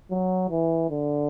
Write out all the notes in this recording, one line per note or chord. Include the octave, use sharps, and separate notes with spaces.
F#3
E3
D3